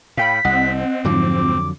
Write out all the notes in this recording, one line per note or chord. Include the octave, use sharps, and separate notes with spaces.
A2 F5 G5 B5 B6
C2 C4 D#5 F#5
F2 G#2 D3 F3 F#3 D6